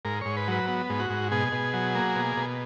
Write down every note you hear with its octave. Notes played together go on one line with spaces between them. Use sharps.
G#2 A#4
G#2 C#5
B4
F#3 B4
B3
G#2
F#4
G#2
B2 G#4
B2
F#3
A#3
B2
B2